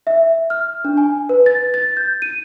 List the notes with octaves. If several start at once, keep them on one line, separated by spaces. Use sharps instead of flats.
E5
F6
D4
G#5
B4
A6
A6
G6
D#7